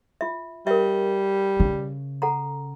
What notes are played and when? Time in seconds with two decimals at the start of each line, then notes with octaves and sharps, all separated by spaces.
0.21 F4 E5
0.67 G3 A#4 E5
1.60 C#3
2.22 A4 F#5 A#5